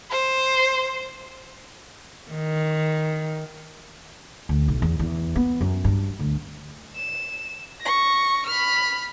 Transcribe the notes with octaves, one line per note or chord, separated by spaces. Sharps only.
C5
D#3
D2
B1
E2
E2
B3
F#2
G2
D2
E7
C#6 A#6
B5 F6